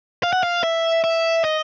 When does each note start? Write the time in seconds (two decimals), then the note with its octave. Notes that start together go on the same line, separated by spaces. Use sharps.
0.23 F5
0.33 F#5
0.43 F5
0.63 E5
1.04 E5
1.44 D#5